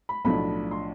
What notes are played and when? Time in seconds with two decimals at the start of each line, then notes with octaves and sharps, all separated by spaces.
0.09 B5
0.25 B1 A2 F3 A3 D4 B5
0.71 C6